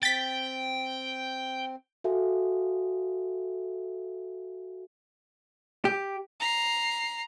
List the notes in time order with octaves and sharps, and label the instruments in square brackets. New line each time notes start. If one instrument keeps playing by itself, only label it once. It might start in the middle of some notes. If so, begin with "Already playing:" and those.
[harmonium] C4 [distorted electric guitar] G5 [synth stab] A6 B6
[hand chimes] F#4 A4 E5 F5 G#5
[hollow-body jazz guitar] G4
[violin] A#5 C7